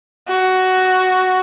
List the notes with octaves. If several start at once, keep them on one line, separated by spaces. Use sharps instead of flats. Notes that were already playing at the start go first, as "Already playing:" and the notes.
F#4